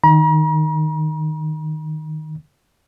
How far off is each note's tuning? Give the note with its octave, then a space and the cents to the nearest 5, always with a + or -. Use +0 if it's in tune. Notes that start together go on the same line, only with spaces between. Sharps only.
D#3 -5 A#5 +45